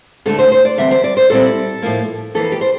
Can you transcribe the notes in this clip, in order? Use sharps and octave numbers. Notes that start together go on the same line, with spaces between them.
D2 D3 A3 D4 A4
C5
C5
D5
E2 D3 G3 C4 E5
C5
D5
C5
A#2 G3 C4 E4 A4
A2 F3 A#3
F2 E3 A#3 A4
G4
C5